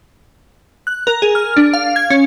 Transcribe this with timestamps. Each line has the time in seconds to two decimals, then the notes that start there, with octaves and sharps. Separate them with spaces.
0.87 F#6
1.07 A#4
1.22 G#4
1.35 F6
1.57 D4
1.73 F5
1.96 G#6
2.10 C#4